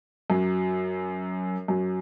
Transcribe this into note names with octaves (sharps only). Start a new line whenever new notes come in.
F#2 F#3
F#2 F#3